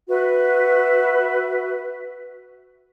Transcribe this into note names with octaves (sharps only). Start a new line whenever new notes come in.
F#4 B4 E5